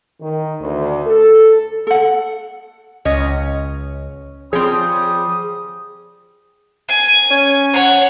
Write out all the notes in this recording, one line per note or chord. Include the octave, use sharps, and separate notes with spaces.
D#3
D2
A4
A4 F#5
C#2 C#4 C#5 D#5
F3 G3 C4 G#4 C#5 D#6
G#5
C#4
C#5 F#5